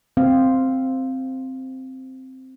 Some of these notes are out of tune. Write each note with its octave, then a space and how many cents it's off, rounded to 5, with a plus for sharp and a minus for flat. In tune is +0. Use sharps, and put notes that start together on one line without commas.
C4 +0 F5 +0